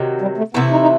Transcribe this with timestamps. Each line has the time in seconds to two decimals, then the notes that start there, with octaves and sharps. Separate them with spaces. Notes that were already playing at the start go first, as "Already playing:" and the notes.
Already playing: C3 D#3 F#3
0.22 G3
0.38 A3
0.54 C3 E3 A3 B3 E4
0.71 D#4
0.81 D#4